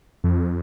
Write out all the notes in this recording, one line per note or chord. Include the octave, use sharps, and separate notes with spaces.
F2